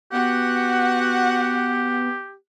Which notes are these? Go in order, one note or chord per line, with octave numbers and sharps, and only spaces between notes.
B3 F#4 G4 F#5